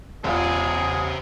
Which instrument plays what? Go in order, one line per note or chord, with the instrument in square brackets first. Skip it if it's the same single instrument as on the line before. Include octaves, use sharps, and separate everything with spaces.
[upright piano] E1 E2 F4 [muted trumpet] G#4 [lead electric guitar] C5 E5